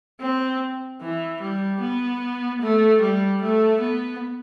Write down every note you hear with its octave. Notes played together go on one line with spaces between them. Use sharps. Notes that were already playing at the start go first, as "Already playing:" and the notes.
C4
E3
G3
B3
A3
G3
A3
B3